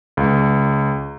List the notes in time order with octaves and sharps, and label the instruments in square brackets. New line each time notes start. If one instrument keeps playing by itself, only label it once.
[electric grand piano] C#2